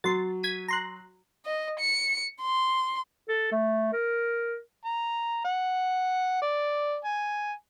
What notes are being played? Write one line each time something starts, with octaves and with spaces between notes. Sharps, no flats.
F#3 C6 A6
G#6 B6 D#7
A#5 C6 F#6
D#5
C#7
C6
A4
A3
A#4
A#5
F#5
D5
G#5